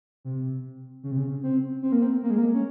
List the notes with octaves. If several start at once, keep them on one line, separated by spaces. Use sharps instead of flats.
C3
C#3
C3
C#3
C4
C4
A#3
C4
A#3
G#3
A#3
C#4